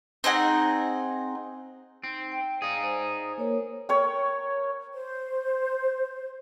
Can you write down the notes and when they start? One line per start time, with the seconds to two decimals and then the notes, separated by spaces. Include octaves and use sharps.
0.24 C4 D#4 G#4 F#5
2.04 C4 D#4
2.32 G5
2.62 D#4 G#4 D5 F5
2.83 C5 G#5
3.38 A#3 A#4 C#5
3.89 A#4 C#5 G5
4.94 C5